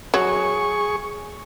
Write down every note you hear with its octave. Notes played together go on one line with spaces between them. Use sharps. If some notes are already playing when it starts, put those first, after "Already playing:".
F#3 G#4 C#6